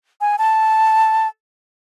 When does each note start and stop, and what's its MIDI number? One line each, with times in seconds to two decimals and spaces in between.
0.21 0.36 80
0.38 1.27 81